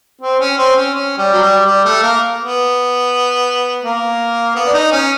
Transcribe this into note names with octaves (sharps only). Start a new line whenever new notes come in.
C4
C#4
C4
C#4
C#4
G3
F#3
G3
G3
A3
A#3
B3
A#3
B3
D4
D#4
C#4